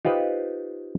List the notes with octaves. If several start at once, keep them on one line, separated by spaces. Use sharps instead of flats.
D#4 F4 G4 B4 C5